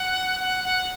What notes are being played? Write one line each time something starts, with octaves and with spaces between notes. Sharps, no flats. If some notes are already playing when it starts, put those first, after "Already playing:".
Already playing: F#5
F#5
F#5